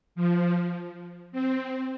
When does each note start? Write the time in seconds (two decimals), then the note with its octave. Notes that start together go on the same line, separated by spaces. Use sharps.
0.15 F3
1.32 C4